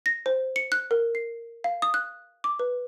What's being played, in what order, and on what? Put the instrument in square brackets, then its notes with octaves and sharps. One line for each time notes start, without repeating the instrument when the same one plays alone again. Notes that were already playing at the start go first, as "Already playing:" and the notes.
[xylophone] A#6
C5
C#7
F#6
A#4
C7
F5
D#6
F#6
D6
B4